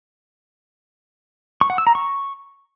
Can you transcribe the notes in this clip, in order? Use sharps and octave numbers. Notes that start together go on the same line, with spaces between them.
C#6
F#5
E6
A#5
C#6